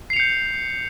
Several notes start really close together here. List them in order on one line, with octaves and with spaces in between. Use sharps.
C7 F7 C#7 G6